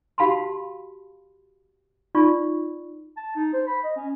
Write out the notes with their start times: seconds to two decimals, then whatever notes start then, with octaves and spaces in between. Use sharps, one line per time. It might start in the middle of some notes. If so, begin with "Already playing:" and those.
0.18 F#4 G4 F5 A5 B5 C6
2.15 D#4 F4 D5 C#6
3.17 A5
3.36 D#4
3.54 C5
3.67 B5
3.84 D#5
3.97 C#4